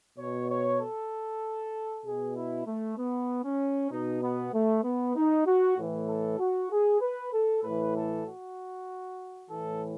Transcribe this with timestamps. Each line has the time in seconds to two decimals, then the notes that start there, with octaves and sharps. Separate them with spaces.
0.18 B2 C#5
0.49 C#5
0.80 A4
2.05 B2 G#4
2.36 E4
2.67 A3
2.98 B3
3.44 C#4
3.91 B2 D#4
4.22 B3
4.53 A3
4.84 B3
5.16 D#4
5.47 F#4
5.78 A2 E3
6.09 A4
6.39 F#4
6.71 G#4
7.01 B4
7.33 A4
7.63 A2 E3 B4
7.95 A4
8.26 F#4
9.50 A2 E3 A4